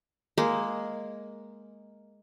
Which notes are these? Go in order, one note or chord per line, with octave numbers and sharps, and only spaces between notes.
G#3 A#3